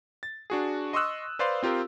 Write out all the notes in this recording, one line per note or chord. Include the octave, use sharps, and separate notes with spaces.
A6
D4 F#4 G#4
D#5 C6 C#6 D#6 E6 F#6
B4 C5 D5 F5 C6
C4 F4 G4 A#4